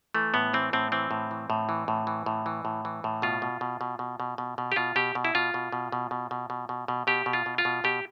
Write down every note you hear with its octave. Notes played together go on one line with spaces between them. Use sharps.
E3 A3
A2 B3
E3 C4
A2 C4
E3 C4
A2
E3
A2
E3
A2
E3
A2
E3
A2
E3
A2
B2 F4
B2
B2
B2
B2
B2
B2
B2
G4
B2 F4
B2 G4
B2
E4
B2 F4
B2
B2
B2
B2
B2
B2
B2
B2
B2 G4
B2
F4
B2
F4
B2
B2 G4